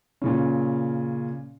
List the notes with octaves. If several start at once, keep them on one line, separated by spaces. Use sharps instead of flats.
A#2 C#3 C#4